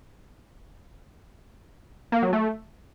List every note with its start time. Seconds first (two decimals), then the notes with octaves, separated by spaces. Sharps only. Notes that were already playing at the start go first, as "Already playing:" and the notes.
2.12 A#3
2.22 F#3
2.33 A3